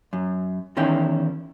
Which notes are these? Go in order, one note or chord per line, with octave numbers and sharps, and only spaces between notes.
F#2
E2 D#3 C#4 E4 G5